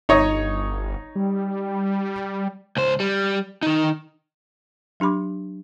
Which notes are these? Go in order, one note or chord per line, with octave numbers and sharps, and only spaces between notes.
G1 D#4 C#5 D#5
G3
C#2 C5
G3
D#3 D#4
F#3 D4 G4 B5 D6